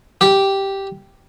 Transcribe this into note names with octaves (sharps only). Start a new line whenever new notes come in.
G4